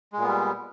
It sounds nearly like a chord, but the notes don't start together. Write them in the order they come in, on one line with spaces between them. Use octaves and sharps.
G#3 A#2 B3 G3